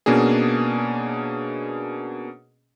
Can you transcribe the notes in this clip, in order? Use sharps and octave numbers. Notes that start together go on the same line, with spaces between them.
B2 A#3 C#4 D4 G#4